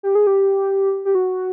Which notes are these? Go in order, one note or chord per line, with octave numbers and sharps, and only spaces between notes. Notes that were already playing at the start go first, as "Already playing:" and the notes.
G4
G#4
G4
G4
F#4